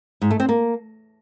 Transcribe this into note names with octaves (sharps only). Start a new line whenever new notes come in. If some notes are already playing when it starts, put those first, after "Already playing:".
G#2
A3
C4
A#3